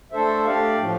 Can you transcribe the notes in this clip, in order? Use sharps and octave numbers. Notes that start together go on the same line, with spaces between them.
A3 D4 A4 C5 E5
A3 D4 G4 D5 F5
A2 F3 A3